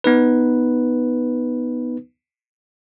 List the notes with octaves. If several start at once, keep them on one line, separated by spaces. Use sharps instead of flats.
B3 D#4 B4